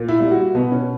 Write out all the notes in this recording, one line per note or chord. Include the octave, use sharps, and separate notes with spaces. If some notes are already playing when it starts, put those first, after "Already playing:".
Already playing: A#2
E4
G3
F#4
B2 B3
C#4